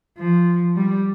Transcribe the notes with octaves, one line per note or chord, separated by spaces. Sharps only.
F3
G3